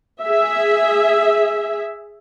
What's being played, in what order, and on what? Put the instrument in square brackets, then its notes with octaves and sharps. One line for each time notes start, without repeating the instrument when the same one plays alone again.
[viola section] G#4 E5